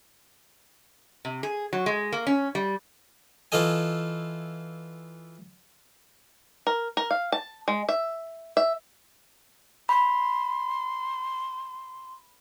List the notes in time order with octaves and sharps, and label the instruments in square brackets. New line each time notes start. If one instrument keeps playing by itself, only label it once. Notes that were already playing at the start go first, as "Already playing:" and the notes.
[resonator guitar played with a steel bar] C3
G#4
F#3
G#3
A#3
C#4
G3
[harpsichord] E3 F4 A4 D#5 G#5
[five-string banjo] A#4
A#4
F5
A5
G#3
E5
E5
[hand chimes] B5 [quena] C6